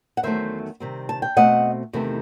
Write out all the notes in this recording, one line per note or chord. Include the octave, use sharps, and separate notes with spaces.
F#5
E2 D#3 F#3 A3 C5 E5
C3 D#3 G3 C4
A5
G5
B2 A3 C4 D#5 F#5
E2 C3 D#3 A3 C4